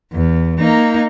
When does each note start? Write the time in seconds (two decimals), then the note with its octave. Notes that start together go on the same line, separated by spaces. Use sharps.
0.13 E2
0.59 A#3 D#4